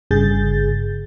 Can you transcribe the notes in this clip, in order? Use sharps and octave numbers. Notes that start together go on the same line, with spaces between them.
G1 G2 C#3 G#4 G6 A6